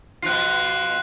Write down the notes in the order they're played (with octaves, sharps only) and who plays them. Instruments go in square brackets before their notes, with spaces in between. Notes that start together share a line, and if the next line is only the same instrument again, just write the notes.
[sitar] B2 F3 F4 [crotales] F#6 C7